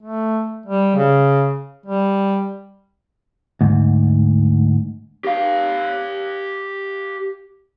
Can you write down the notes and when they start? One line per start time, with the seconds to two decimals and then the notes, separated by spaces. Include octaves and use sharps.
0.03 A3
0.66 G3
0.96 C#3
1.86 G3
3.61 D2 G#2
5.24 G4 F5